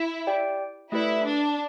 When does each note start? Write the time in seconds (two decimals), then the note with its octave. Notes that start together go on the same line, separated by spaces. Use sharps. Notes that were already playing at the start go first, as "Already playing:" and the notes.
Already playing: E4
0.27 G4 D5 G5
0.92 A3 E4 G4 B4 D5
1.26 D4